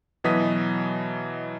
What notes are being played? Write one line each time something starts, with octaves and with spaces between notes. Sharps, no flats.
B2 E3 F#3 D#5 D#6 B6